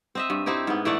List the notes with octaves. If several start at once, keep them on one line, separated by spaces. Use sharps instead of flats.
C4 D#5 E5
G2
C4 D#4 E4 G4
G#2 B3
E3 A3 D5 F#5